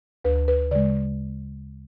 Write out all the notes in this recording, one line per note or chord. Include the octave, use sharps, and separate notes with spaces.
D2 B4
B4
C#3 G#3 D5